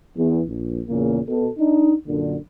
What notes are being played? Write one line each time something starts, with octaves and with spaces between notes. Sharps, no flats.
E2
A#1
E2 A#2 C#3 A#3 C#4
B2 A4
D4 D#4
F#2 A#2 D3